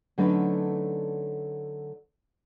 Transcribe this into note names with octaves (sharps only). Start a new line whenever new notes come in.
D3 F#3 A3 C#4 D#4 B4